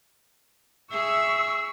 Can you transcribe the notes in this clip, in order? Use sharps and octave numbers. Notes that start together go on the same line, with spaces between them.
G#4 E5 C#6 E6